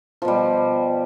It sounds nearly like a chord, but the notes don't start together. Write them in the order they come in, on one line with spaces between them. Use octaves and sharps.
F3 B2 G3